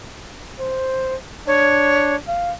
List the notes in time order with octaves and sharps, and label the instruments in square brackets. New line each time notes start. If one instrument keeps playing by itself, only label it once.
[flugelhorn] C5
[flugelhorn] D4 [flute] C#5
[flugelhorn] F5